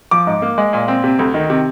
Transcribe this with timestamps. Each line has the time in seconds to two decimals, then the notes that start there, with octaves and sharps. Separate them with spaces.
0.11 F3 D6
0.27 G#2
0.42 A#3
0.58 G#3
0.73 A#2
0.88 C4
1.04 C3
1.19 D2
1.34 D#3
1.50 C3